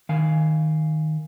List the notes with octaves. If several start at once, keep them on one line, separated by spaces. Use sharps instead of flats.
D#3 F5 G#5